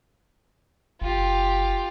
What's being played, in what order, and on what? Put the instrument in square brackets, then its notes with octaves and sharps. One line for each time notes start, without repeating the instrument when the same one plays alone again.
[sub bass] F#1 [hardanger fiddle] F4 G4